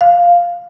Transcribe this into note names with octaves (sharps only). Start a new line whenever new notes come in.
F5